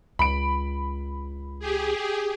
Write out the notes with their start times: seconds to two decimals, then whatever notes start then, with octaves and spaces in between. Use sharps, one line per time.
0.19 C#2 B5 D7
1.59 G4 G#4